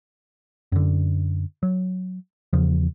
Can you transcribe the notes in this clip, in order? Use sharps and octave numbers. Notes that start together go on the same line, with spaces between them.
F#2 D3
F#3
E2 C#3 F3